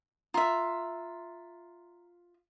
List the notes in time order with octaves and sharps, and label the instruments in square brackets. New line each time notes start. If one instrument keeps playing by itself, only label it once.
[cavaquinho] F4 E5 [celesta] A#5 C6